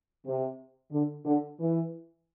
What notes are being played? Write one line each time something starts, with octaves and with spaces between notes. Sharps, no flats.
C3
D3
D3
E3